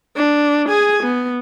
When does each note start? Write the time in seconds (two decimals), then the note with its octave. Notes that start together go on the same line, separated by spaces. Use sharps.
0.17 D4
0.69 G#4 G#5
1.03 B3